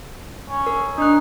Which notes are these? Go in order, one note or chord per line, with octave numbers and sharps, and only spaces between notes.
C#4
A#4
D4 D#4 F#6